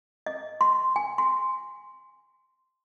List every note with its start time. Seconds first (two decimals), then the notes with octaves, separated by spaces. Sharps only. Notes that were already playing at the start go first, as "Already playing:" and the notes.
0.26 D#5
0.61 C6
0.96 G#5
1.18 C6